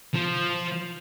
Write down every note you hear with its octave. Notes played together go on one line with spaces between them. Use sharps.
F3